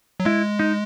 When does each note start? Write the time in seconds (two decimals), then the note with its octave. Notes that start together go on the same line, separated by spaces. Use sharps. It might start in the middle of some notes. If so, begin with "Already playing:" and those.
0.20 F#3
0.25 G#3 E4
0.59 D#4